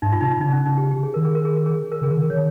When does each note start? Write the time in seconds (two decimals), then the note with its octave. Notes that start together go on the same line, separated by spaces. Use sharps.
0.02 G#2 D#4
0.12 F4
0.21 C3 D#4
0.40 C#3 D#4
0.53 C#4
0.65 D#4
0.78 G4
0.91 G4
1.03 G#4
1.14 D#3 A#4
1.25 G#4
1.35 A#4
1.45 G#4
1.56 A#4
1.66 G#4
1.92 A#4
2.01 C#3 G#4
2.11 D#3 A#4
2.30 D#3 C#5